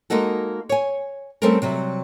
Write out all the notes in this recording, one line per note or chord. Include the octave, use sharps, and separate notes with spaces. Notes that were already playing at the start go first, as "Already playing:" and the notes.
G#3 A#3 D#4 F#4 A4
C#5 G#5
G3 A3 C4 C#4 A4 A#4
C3 F#3 G3